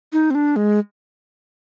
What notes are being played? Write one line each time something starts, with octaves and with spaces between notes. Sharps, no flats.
D#4
C4
D4
G#3